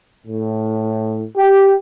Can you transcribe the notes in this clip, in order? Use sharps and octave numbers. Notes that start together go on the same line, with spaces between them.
A2
G4